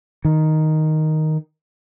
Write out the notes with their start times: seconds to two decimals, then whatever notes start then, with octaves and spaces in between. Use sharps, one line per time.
0.25 D#3